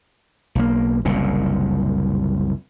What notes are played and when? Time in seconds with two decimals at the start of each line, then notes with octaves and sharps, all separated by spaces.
0.55 B1 A#3
1.05 F#1 C2 A#2